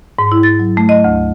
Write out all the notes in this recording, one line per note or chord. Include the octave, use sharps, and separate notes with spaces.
G#2
E4
A6
F#3
A3
D#5
D2